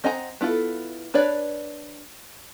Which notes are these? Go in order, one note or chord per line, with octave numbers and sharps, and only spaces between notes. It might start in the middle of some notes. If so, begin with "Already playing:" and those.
C4 D#5 F#5 G#5 A#5
B3 E4 F4 A4
D4 B4 C#5 D5 B5